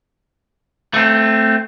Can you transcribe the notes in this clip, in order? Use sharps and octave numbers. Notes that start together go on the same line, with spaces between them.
A3 C4